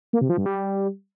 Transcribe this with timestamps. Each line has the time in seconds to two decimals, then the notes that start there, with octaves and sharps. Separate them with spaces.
0.13 A#3
0.21 C3
0.29 F3
0.38 G2
0.46 G3